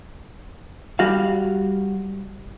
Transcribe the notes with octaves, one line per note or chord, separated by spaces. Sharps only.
G3 F#4 F5